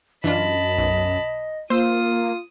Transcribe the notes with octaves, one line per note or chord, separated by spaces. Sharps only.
F#2 E3 D4 F4 D#5 A5 B5
B1
A#3 F4 C5 D#6 E6